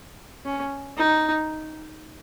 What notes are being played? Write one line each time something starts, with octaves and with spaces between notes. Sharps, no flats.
C#4
D#4